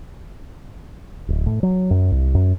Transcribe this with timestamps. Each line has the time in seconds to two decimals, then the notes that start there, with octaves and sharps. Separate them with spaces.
1.28 D1
1.46 A2
1.63 F#3
1.91 F#2
2.12 C2
2.35 F#2